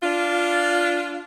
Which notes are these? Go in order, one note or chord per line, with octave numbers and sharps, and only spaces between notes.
D4 F4